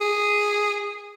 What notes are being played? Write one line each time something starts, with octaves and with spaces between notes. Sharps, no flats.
G#4